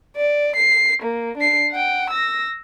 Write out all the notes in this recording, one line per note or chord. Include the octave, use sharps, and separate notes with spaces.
D5
C7
A#3
D4 C7
F#5 G5
E6 A#6